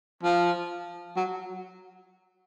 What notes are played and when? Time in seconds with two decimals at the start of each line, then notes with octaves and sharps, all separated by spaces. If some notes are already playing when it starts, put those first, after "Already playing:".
0.23 F3
1.16 F#3